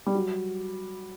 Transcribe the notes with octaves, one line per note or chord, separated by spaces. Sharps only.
G3
F#3